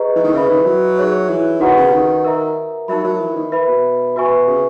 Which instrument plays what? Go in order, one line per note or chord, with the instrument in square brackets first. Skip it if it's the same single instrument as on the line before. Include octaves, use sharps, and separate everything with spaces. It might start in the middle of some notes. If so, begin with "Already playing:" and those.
Already playing: [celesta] G#4 B4 D#5 A#5 C#6
[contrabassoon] E3
D#3
[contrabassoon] C#3 [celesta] B4 E5 B5
[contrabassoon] D#3
E3
F#3
[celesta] D#4 G#4 C#5 E5
[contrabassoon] E3
[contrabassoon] D#3 [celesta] F#4 B4 F#5 A#5 C#6
[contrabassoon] C#3
D#3
[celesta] A#4 E5 A#5
[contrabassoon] F#3 [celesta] D#4 A#4 E5 B5
[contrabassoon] F#3
E3
D#3
[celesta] B4 E5 B5
[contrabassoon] B2
[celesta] F#4 B4 E5 G#5 C#6
[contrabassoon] C#3